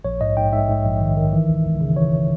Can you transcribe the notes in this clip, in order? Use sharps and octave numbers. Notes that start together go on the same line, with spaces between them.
A#1 C#5
G#2 D#5
G#2 G5
G#2 E5
G#2
A#1
D#3
D#3
E3
C#2
C#2
C#3
E3 C#5